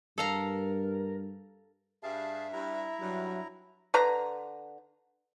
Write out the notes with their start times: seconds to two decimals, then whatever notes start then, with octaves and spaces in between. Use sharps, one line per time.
0.18 G2 A4 A#4 F5 A#5
2.03 G2 G#4 E5 F5 A5
2.53 G2 E4 A#5
3.01 G2 F#3
3.94 D3 B4 A#5